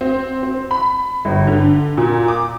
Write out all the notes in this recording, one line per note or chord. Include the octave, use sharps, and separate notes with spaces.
C4
C4
B5
G1
D3
A#2
D6